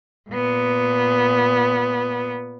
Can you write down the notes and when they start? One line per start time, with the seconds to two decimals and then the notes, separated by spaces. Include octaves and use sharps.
0.30 A#2 B3